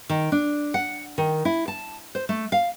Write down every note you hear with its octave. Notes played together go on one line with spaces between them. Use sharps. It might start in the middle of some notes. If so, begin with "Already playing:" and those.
D#3
D4
F#5
D#3
E4
A5
C5
A3
F5